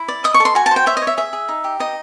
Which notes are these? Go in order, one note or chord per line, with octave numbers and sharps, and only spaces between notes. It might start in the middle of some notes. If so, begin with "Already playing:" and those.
Already playing: E4
D5
D#5 D#6
C#6
A4
C6
F#4 G#5
A5
C5
G5
C#5 E5
D#5
C#5
E5
G#4 E5
G#4
D#4
G4
D#4 D#5